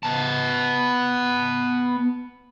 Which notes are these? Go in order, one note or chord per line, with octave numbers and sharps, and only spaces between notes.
B3 A5